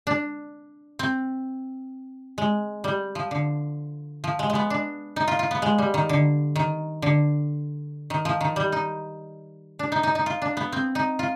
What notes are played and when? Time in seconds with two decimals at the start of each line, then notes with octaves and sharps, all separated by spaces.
0.07 D4
0.99 C4
2.38 G#3
2.84 G3
3.15 F3
3.31 D3
4.24 F3
4.39 G#3
4.50 G#3
4.55 B3
4.70 D4
5.16 D#4
5.28 F4
5.39 F4
5.51 B3
5.62 G#3
5.78 G3
5.94 D#3
6.09 D3
6.56 D#3
7.02 D3
8.10 D#3
8.25 F3
8.41 D#3
8.56 G3
8.72 D#4
9.79 D4
9.92 D#4
10.03 D#4
10.15 D#4
10.26 F4
10.42 D4
10.57 B3
10.72 C4
10.95 D#4
11.19 F4